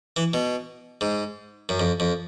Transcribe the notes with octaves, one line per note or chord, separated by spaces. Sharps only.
E3
B2
G#2
F#2
F2
F2